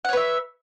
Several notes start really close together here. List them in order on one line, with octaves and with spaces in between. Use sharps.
F#5 C#5 B4 E5